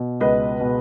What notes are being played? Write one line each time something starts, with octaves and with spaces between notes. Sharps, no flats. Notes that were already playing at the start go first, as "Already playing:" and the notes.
Already playing: B2
C#2 B4 D#5
B2